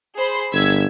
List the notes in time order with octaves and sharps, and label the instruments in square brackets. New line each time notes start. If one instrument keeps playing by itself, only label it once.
[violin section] G#4 C5 B5
[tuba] G1 [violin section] E6 G#6 B6